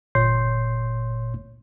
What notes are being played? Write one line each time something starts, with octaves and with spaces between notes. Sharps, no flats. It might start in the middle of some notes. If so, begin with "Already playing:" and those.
G1 A#2 C#5 C6 G6 C7